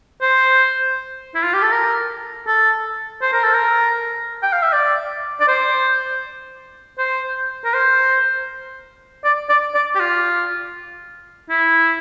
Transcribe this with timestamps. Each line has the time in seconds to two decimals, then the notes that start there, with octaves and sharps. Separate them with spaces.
0.22 C5
1.35 E4
1.44 F4
1.53 G4
1.62 A4
1.72 A#4
2.47 A4
3.22 C5
3.33 A#4
3.43 A4
3.54 A#4
4.43 G5
4.53 F5
4.63 E5
4.73 D5
5.40 D5
5.48 C5
6.98 C5
7.64 A#4
7.74 C5
9.24 D5
9.49 D5
9.74 D5
9.95 G4
10.00 F4
11.50 E4